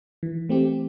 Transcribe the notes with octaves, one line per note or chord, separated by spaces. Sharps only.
E3
A3 C4 G4